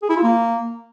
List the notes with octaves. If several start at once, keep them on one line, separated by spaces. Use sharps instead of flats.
G#4
E4
F4
A#3